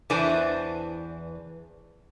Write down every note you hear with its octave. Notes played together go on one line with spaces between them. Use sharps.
E2 E3 D4 B4 C5 G#5